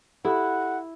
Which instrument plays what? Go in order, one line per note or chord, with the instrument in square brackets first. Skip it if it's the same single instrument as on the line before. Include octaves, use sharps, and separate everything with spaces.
[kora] E4 [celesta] G4 A4 [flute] F#5